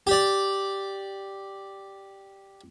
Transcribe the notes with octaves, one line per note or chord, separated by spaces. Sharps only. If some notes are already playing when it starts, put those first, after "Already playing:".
G4 D5